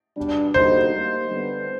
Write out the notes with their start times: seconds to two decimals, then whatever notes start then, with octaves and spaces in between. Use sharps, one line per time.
0.17 B2 G3 B3 D4
0.54 D3 G3 A#3 D#4 F#4 C5
0.92 G3 A#3 D#4
1.31 D3 G3 B3